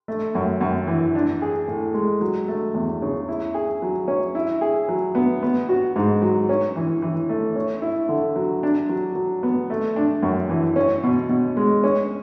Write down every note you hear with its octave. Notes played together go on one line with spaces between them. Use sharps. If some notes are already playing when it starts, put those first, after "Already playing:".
A3
F#2
F#2
E3
D4
G#4
A2
G#3
F#3
A3
E2
C#3
E4
G#4
F#3
C#4
E4
G#4
F#3
B3
B3
F#4
G#2
F#3
C#4
E3
E3
A3
C#4
E4
D3
F#3
D4
F#3
F#3
B3
A3
D4
F#2
E3
C#4
B2
B2
G#3
C#4